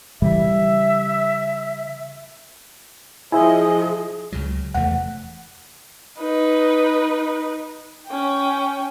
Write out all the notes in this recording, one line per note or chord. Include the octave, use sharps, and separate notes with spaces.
C#3 E3 G3 E5
F3 E4 G#4 C5 D#5 E5 G#5
C#2 C#3 F#3
F1 E2 A3 F#5
D#4 B4
C#4 G5